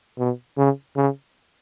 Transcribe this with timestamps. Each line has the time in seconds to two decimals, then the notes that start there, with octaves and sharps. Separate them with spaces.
0.18 B2
0.58 C#3
0.96 C#3